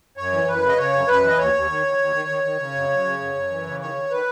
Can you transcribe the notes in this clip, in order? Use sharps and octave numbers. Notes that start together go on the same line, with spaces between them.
F#2 C#5
E3
F#2 B4
C#3
D#5
C#3 C#5
F#2
F#2 B4
E3
D#5
D#2 C#5
D#2
D#3
D#2
D#2
D#3
D#3
D#3
C#3
F#2
F#2
C#3
F#2
F#2
E3
C#3
D#3 C#5
D#3
D#3 B4